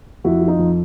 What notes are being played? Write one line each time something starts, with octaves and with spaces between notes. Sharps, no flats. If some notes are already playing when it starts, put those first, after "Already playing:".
F2 E4 F#4
F3
D#4 F4
F2